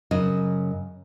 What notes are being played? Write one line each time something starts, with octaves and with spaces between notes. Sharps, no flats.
F#2 C#3 D#5